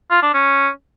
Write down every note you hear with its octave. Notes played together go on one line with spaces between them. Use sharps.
F4
D4
C#4